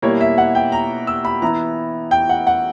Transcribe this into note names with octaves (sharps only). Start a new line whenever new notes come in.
B2 G3 A#3 E4 C#5
E5
F#5
G5
A#5
E6
B5
E3 B3 E4 A#5
G5
F#5
F#5